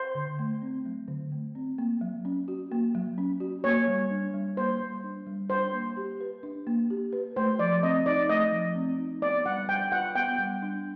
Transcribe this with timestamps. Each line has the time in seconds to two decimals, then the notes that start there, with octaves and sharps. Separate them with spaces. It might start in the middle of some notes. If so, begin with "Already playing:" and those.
Already playing: C5
0.15 D3
0.39 A3
0.62 C4
0.86 F#3
1.08 D3
1.32 A3
1.55 C4
1.78 A#3
2.01 F#3
2.25 C#4
2.48 F#4
2.72 A#3
2.95 F#3
3.18 C#4
3.40 F#4
3.64 A#3 C#5
3.87 G3
4.11 D4
4.34 G3
4.57 A#3 C5
4.81 G3
5.04 D4
5.26 G3
5.50 D4 C5
5.73 A#3
5.97 G4
6.21 B4
6.43 D4
6.67 A#3
6.90 G4
7.13 B4
7.36 A3 C5
7.59 F3 D5
7.82 C4 D#5
8.06 D#4 D5
8.29 A3 D#5
8.52 F3
8.75 C4
8.99 D#4
9.22 B3 D5
9.46 G3 F#5
9.69 D4 G5
9.92 F4 F#5
10.15 B3 G5
10.38 G3
10.62 D4